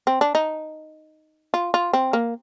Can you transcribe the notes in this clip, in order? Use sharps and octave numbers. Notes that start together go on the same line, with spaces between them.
C4
D4
D#4
F4
F4
C4
A#3